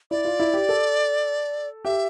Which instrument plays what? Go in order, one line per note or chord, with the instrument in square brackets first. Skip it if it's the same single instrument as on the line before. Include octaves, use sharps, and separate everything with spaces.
[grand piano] E4 [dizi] D5
[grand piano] F4
E4
G4
A4
[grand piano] G4 [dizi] E5